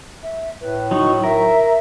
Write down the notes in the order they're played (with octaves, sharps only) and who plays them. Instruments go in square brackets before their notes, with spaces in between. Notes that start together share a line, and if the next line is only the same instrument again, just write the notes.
[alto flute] E5
[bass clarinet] A2 [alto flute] B4
[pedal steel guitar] F#3 D#4 [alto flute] C#6
[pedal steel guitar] A#4 [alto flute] E5